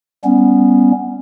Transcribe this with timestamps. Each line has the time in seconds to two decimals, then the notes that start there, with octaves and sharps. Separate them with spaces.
0.24 G3 B3 C#4